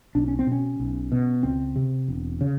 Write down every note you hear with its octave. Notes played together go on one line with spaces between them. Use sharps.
B1 D4
C#4
C4
B2 C#4
B1
B2
C#2 C4
C3
E1
C#3